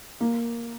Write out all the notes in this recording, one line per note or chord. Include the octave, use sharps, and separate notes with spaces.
A#3